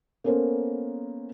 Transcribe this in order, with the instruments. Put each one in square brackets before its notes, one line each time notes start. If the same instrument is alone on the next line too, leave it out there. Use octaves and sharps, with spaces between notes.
[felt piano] A#3 B3 C#4 A4 A#4 C5